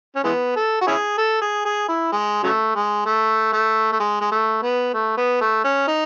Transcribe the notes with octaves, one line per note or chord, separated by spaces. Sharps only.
C#4
E3 G#3 B3
A4
F#4
C#4 E4 G#4
A4
G#4
G#4
E4
G#3
C#3 F#3 A3
G#3
A3
A3
A3
G#3
G#3
A3
B3
A3
B3
A3
C#4
D#4